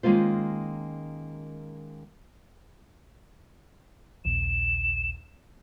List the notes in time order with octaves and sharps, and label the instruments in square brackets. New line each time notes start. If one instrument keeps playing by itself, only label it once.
[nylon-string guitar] D#3 G#3 A#3 C#4 F4 C5
[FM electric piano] A#1 D#2 A#2 [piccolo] E7